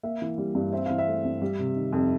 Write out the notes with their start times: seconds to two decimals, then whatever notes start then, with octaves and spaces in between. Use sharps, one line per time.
0.03 A#3 E5
0.22 E3
0.38 G3
0.55 G2
0.73 C4 E5
0.86 E3 F5
0.98 E5
1.08 A3
1.25 G2
1.42 G3
1.59 C3
1.76 D#3
1.93 F2